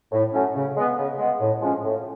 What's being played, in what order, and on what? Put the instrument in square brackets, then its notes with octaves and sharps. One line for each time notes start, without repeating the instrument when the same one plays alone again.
[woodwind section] A2
F#3 A3 C#4
C#3
G#3 B3
C#3
G#3 B3
A2
F3 G#3 C#4
A2